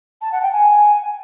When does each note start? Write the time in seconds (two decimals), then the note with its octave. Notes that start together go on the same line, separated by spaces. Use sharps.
0.22 A5
0.32 F#5
0.42 G5
0.52 G#5